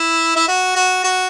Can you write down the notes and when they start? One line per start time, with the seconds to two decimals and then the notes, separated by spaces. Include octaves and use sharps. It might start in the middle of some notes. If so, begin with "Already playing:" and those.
Already playing: E4
0.36 E4
0.48 F#4
0.75 F#4
1.03 F#4